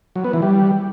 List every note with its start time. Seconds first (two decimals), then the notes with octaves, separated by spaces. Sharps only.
0.16 F#3
0.24 B3
0.33 E3
0.42 G3